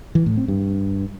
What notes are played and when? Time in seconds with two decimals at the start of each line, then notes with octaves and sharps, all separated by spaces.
0.15 E3
0.26 A2
0.37 C4
0.48 G2